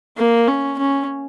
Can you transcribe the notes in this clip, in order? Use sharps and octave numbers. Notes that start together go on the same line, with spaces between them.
A#3
C#4
C#4